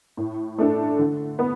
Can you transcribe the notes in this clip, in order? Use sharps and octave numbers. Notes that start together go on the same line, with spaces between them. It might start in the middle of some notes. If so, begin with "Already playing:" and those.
A2
A3 D4 A4
D3
B3